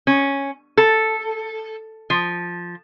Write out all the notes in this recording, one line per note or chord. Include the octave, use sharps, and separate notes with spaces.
C#4
A4
F3